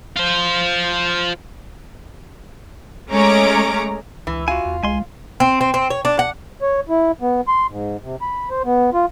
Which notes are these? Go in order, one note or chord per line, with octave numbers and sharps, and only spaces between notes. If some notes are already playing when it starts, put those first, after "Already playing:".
F4 C5
G#3 A3 C#4 C#5 A#5 D6
C#2 E3
F4 F#4 G#5
E2
C2 G#3 G#5 C6
C4
C4
C4
C#5
D4
F#5
C#5
E4
B3
C6
G#2
C3
B5
C5
B3
F4